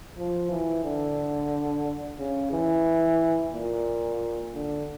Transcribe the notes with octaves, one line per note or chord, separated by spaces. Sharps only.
F3
E3
D3
C#3
E3
A#2
D3